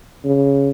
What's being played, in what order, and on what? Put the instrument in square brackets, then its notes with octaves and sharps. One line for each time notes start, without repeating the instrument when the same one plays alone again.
[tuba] C#3